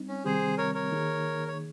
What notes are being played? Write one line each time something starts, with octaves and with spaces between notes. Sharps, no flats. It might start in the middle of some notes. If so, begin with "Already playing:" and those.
Already playing: G3 C4 D#4
C#4
C3 D#3 G3 C4 G4 G#4 C5
A#4 C#5
A#4 C#5
D#3 A#3 D#4 G#4
C#5